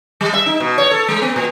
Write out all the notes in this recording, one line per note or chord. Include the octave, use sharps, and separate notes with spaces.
G3
E5
D#4
B2
C#5
A4
G#3
B3
A#2